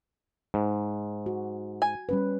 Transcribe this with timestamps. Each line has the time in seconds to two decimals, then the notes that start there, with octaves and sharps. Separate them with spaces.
0.54 G#2
1.26 F#4
1.82 G#5
2.09 G3 C#4 B4